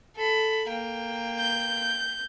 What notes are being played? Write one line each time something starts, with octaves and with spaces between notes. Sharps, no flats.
A4 B5
A#3 G5
G6